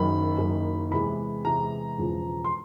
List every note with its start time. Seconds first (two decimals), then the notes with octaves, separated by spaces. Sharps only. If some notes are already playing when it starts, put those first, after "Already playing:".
Already playing: F#1 F#2 D#3 B5
0.38 F#1 F#2 D#3
0.91 E2 C3 E3 G#3 B5
1.44 E2 C3 E3 G#3 A#5
1.98 E1 E2 C#3 F3
2.45 C6